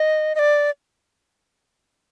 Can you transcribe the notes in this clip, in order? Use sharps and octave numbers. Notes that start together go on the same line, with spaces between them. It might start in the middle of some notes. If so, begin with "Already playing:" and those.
Already playing: D#5
D#5
D5